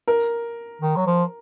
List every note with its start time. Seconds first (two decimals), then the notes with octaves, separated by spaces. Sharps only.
0.07 A#4
0.82 D#3
0.96 F#3
1.06 F3